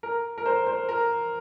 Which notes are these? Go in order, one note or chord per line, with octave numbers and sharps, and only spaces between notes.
A#4
A#4
C5
C5
A#4